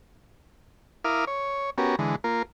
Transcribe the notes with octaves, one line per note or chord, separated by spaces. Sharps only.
E4 A#4 F5 D6 D#6 F6
C#5
B3 C#4 F#4 G4 A#4
D3 E3 G#3
A#3 F4 A#4